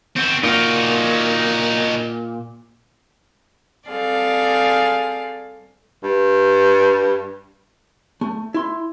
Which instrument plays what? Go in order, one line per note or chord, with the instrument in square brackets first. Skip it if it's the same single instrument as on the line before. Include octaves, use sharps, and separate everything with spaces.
[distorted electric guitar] C4 F#4
[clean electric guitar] A#2 [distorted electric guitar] D#4 F#4
[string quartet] G3 C4 G#4 A4 D5 F5
[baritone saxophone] G2
[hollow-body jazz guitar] A3
E4 C6